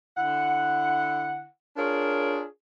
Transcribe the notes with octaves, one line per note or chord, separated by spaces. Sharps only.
D3 E4 F#5
D4 F4 G#4 A#4 C#5